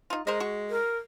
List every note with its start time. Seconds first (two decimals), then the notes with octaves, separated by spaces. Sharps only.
0.10 D#4 F4
0.27 G#3 A#4 C5 D#5
0.40 F#4 C#6
0.70 A#4